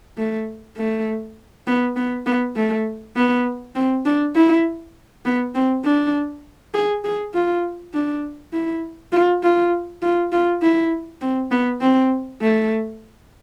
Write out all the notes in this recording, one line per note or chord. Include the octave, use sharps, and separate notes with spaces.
A3
A3
B3
B3
B3
A3
B3
C4
D4
E4
B3
C4
D4
G#4
G#4
F4
D4
E4
F4
F4
F4
F4
E4
C4
B3
C4
A3